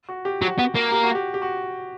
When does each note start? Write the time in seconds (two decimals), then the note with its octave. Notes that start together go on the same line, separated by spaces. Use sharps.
0.09 F#4
0.25 G4
0.42 F#3 F#4
0.59 B3
0.75 A#3
0.92 G4
1.04 F#4
1.15 G4
1.34 G4
1.42 F#4